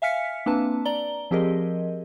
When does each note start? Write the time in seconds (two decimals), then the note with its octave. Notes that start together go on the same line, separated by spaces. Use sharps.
0.02 E5 F5 G#5 F6 B6 C#7
0.46 A#3 C4 D4 B4 A5
0.85 D5 A#5 G7
1.31 F3 C4 G4 G#4 A#4 D#5